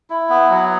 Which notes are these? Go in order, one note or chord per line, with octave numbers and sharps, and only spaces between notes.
E4
B3
F#3